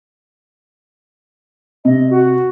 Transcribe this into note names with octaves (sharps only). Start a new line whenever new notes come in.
C3 D#5
F#4